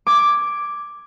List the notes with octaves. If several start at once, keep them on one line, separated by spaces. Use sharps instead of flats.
D6 G#6